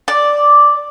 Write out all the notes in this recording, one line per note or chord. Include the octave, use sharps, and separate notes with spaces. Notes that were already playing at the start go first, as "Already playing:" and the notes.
D5